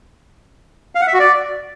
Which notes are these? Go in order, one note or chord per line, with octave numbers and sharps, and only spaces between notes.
F5
F#5
E5
F#4
D5